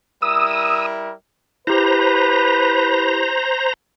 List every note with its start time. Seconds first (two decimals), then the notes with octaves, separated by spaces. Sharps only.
0.22 G3 E4 A#4 D#6 E6
1.67 E4 G4 B4 C5 A#5